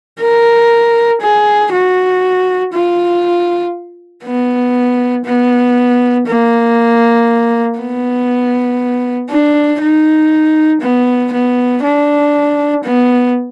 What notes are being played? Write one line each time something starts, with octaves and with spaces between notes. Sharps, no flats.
A#4
G#4
F#4
F4
B3
B3
A#3
B3
D4
D#4
B3
B3
D4
B3